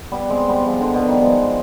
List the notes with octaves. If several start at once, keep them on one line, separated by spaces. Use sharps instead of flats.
G3 B3
G#3 C4
G3 B3
F3 G#3
D3
B2
D#3 G3
F3 G#3